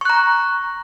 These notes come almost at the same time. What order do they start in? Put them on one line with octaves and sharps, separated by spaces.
C#6 F#6 A#5